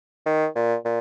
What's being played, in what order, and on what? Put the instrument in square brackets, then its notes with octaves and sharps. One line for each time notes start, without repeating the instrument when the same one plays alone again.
[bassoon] D#3
A#2
A#2